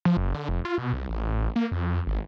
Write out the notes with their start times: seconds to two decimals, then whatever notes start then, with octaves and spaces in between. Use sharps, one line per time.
0.05 F3
0.17 F#1
0.35 D3
0.49 F1
0.65 F4
0.78 B2
0.93 C2
1.09 A1
1.56 A#3
1.72 F2
2.07 G#1